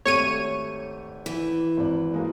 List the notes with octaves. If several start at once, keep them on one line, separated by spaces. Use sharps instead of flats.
G#1 A3 G4 C#5 C#6 D#7
E3
G#1 D5
G#3 A#3 F#4